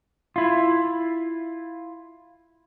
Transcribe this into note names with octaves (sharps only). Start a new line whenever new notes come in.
E4 F4